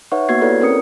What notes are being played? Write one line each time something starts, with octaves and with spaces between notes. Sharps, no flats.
D#4 B4 C#5 E5 F#5 C#6
A#3 B3 F#4 G#6 C7
E4 G4 A4 B4 C#5 D5
C4 C#4 A#4 D#6 C#7